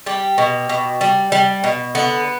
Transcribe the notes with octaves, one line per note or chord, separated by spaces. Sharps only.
G3 G4
B2
B2
G3
G3
B2
D3 B3